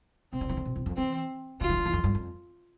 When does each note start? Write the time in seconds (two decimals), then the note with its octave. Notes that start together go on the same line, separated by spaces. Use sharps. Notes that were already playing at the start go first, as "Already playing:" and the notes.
0.33 C3 C4
0.41 D3
0.49 E3
0.57 D3
0.65 B2
0.76 E2
0.86 F2
0.97 E3 C4
1.61 D3 F4
1.69 E3
1.77 D3
1.85 E2
1.93 F2
2.04 G2
2.15 F2